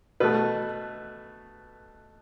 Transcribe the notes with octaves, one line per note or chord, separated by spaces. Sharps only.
B2 A3 B4